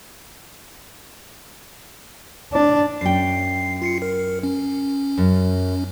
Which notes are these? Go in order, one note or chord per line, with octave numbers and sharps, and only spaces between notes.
D4
F#2 G5 C7
F4 C7 C#7
A#4
C#4
F#2